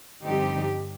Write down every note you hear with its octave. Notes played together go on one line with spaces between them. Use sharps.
G2 D3 F3 C4 D#4 G4